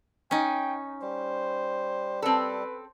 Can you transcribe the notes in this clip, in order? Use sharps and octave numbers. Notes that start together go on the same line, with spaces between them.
C#4 D#4 G5
G3 C5
C4 A4 B4